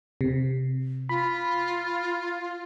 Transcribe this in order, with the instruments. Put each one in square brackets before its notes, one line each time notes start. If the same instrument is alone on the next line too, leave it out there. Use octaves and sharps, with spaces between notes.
[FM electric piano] C3
[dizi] F4 [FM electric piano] B5